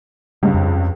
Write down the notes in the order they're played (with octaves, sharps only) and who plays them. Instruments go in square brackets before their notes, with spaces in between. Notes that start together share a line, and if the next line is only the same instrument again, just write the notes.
[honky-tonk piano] C#2 G2 [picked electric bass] G3
[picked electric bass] F2